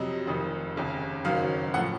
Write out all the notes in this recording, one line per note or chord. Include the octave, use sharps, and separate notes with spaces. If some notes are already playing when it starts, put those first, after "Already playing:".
Already playing: F2 C3 F#3 D#5
F1 F2 D#3
F1 D#2 C#3
F#1 F#2 D#3 F#3 F5
A2 F3 F#5